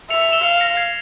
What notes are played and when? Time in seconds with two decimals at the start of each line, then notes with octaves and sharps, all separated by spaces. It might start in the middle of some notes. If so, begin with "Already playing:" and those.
0.10 E5 C#7 F7
0.21 C#7 F7
0.32 E7 G7
0.43 F5 C#7 F7
0.60 A#6 C#7
0.77 G#6 C7